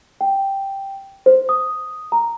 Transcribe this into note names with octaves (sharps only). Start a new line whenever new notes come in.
G5
C5
D#6
A#5